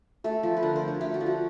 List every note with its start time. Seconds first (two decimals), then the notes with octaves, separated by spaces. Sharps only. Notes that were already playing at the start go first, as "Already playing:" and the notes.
0.24 A3 A4
0.43 F3
0.57 B4
0.63 D3 A#4
0.76 C5
0.82 D3
0.88 C#5
1.01 A3 G4
1.14 F#4
1.20 F3
1.26 F#4